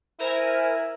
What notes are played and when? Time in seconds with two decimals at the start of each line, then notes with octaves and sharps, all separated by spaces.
0.20 E4 A#4 C5 G#5